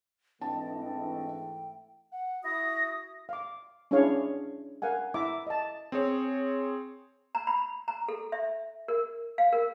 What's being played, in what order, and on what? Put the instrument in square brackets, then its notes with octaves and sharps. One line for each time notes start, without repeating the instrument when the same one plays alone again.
[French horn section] G#2 E3 A3 [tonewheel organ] C4 D4 D#5 [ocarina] G5 [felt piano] A5
[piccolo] F#5
[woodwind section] E4 F#4 D#6 [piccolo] A#6
[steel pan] F5 D6
C#4 D4 E4 G#4 C#5 F5
A#4 F5 F#5 G#5
E4 E5 A#5 D6
D#5 A5
[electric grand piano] C4 G#4 C#5
[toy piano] A#5
B5
A#5
A4
E5
A#4
F5
A#4